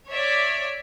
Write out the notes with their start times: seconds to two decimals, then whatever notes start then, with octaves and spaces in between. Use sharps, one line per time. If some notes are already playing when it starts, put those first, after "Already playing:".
0.11 C#5 D5 E5